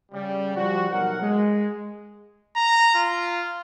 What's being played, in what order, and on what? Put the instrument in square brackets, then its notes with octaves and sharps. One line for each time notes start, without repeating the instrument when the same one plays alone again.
[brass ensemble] C#3 G3
F3 G3 F#4
B1 A#4 F#5
G#3
[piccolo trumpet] A#5
F4